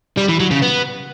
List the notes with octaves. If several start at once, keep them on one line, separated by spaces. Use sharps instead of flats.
G3
E3
F#3
C#3
B3